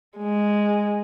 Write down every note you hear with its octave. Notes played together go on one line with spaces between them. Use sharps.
G#3